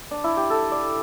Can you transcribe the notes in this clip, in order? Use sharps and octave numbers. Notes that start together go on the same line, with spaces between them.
D4
E4
G4
A4
D5